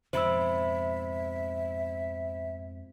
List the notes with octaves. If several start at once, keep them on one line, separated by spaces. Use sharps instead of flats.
F2 G#2 B2 C5 E5 B5 E6